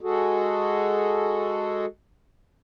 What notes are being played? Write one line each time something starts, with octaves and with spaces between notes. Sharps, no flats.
G#3 F#4 G#4 A4